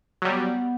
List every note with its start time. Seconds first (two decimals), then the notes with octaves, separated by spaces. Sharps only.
0.22 F#3
0.25 G3 B3